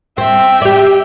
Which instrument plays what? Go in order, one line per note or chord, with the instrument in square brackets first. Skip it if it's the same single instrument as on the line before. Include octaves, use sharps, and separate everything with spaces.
[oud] C4 [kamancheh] E5 G5
[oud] G4 D5